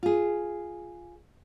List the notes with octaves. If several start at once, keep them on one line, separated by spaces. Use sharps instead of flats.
F4 G#4